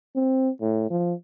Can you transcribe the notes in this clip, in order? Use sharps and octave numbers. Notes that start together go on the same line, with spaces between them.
C4
A2
F3